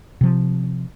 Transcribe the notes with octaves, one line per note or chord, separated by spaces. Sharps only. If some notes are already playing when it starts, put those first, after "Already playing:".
C3 F3